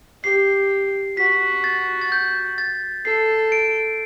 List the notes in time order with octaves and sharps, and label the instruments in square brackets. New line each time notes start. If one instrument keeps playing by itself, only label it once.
[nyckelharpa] G4 [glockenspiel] C7
[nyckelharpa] F#4 [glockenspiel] B6
[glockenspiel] A6
A6
G6
A6
[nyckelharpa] A4 [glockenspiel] C7
[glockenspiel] D7